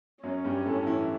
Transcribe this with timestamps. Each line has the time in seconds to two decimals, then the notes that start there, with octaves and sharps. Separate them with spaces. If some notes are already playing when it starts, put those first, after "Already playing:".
0.23 F#2 F#3 C#4
0.44 G2 G3
0.65 A2 A3
0.87 E3 E4